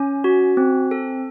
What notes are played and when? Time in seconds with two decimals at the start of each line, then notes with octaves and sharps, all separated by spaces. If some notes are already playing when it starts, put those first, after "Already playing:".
Already playing: C#4 G#5
0.24 F#4
0.57 C4
0.91 A4